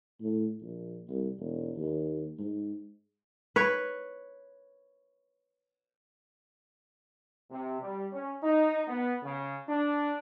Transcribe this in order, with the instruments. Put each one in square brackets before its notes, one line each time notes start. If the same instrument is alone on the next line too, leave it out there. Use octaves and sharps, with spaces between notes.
[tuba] A2
A#1
C2
E1
D#2
G#2
[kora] B4 C#5
[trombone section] C3
G3
C#4
D#4
B3
C#3
D4